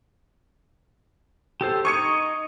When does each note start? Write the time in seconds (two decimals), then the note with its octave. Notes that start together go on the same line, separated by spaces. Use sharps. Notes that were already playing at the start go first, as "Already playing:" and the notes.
1.61 G4 A4 C5
1.85 D#4 D#5 C#6 G#6 C#7